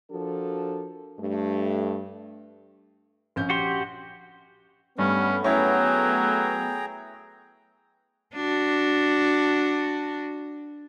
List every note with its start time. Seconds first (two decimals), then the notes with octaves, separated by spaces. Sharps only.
0.11 F3 D4 F#4 A4 A#4
1.20 G2 A3
3.36 A#1 C#4 G6
3.50 F#4 G4 C6
4.99 G2 G3 A3 B3 C#4
5.44 F#3 C#4 E4 G#4 G5 A#5
8.35 D4 F#4